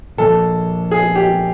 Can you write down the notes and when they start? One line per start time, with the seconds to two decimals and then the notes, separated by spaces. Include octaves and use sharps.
0.17 A#2 F3 A#3 A4
0.91 G#4
1.16 G4